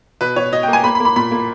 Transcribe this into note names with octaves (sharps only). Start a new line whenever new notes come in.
B2 B4
B2 C#5
B2 D#5
G5
A#3
G#5
A#3 B5
B5
A#3
B5
A#2 B5
A#3